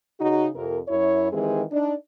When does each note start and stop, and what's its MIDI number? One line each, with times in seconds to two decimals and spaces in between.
0.19 0.47 49
0.19 0.47 63
0.19 0.47 66
0.55 0.78 41
0.55 0.78 48
0.55 0.78 70
0.87 1.28 42
0.87 1.28 64
0.87 1.28 73
1.33 1.62 51
1.33 1.62 52
1.33 1.62 56
1.33 1.62 60
1.33 1.62 67
1.33 1.62 68
1.71 1.93 62
1.71 1.93 63